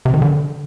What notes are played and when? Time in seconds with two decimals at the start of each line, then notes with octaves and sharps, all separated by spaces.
0.05 C3
0.14 D#3
0.22 D3